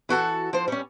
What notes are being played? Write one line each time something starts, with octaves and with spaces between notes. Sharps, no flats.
E3 F#4 A4 A5
F3 C5
G3 C#4